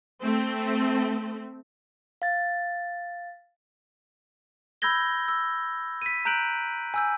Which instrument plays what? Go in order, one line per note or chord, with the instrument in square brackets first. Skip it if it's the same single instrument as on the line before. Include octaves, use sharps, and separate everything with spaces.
[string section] A3 C4
[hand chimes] F5 A6
[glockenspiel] B5 E6 G6 G#6 A#6 G7
E6
B6 D#7
A#5 F#6 G6 D7 F#7
G#5 E6 G6